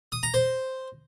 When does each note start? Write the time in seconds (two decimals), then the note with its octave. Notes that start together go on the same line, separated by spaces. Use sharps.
0.12 D#6
0.23 A#5
0.34 C5